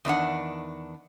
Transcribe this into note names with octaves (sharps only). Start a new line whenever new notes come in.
E2 D#3 D4 F#5